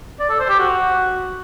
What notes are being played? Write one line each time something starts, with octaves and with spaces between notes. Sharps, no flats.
D5
A4
C5
G4
F#4